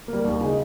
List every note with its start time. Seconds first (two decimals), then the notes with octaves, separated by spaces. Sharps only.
0.08 G3 A#3
0.25 D#2
0.41 C#3 G#3 D#4